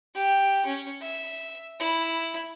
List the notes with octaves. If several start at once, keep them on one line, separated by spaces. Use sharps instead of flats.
G4
C#4
E5
E4